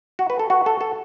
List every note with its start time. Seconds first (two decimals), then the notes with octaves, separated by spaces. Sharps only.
0.19 F#4
0.30 B4
0.39 A4
0.50 F#4
0.66 A4
0.81 A4